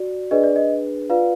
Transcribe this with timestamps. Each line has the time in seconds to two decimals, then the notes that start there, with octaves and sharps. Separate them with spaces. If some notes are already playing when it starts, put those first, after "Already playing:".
Already playing: F#4 D5
0.31 D4 G#4 B4 D5 D#5
0.44 D5
0.56 D#5
1.10 F4 B4 D5 F5